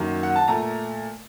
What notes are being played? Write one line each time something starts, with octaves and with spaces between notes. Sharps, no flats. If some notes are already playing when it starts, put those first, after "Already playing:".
Already playing: F#2 D#3 F#3 A#3
F#5
A5
A#2 A3 A#5